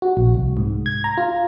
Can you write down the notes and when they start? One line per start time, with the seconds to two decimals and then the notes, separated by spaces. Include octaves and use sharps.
0.02 F#4
0.17 A#1
0.35 C2
0.57 G#2
0.86 G#6
1.04 A#5
1.17 F4